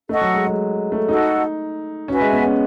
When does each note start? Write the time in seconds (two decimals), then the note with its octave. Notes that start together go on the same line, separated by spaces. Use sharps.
0.09 A3 A4 D#5 F#5 C#6
0.21 F#3
0.34 G#3
0.47 G#3
0.92 A3
1.08 D#4 F#4 A4 D#5 F#5
2.08 C#4 F#4 B4 E5 G#5
2.21 G#3
2.33 B3
2.45 C#4